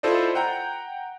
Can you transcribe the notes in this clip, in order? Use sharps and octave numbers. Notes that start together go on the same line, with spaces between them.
E4 F4 A4 C5 D5 D#5
F#5 G5 A#5 G6